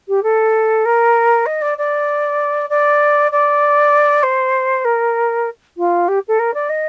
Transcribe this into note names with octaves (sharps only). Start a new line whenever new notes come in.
G4
A4
A#4
D#5
D5
D5
D5
D5
C5
A#4
F4
G4
A4
A#4
D5
D#5